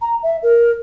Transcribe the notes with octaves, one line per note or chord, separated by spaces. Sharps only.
A#5
E5
A#4